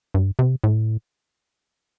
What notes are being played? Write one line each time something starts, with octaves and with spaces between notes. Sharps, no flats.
G2
C3
A2